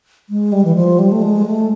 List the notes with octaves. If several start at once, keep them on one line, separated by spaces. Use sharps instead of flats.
G#3
G3
E3
F3
G3
A3
G#3
A3